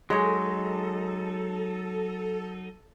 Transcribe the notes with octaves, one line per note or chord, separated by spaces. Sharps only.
F#3 G#3 D#4 A4 C#5